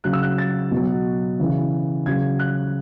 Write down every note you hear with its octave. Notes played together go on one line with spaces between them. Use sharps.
C#3 F#3 F#6
E6
F#6
A6
B2 F#3
C#3 E3
C#3 F#3 G#6
F#6